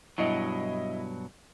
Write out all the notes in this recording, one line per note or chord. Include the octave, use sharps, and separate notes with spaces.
G2 B2 F#3 E4 D#5